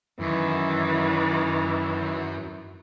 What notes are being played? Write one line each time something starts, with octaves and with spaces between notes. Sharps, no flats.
F#2 D#3 E3